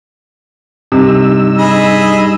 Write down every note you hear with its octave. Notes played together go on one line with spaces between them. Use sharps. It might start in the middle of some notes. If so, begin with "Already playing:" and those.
G2 C3 D#4 E6
G#4 D#5 B5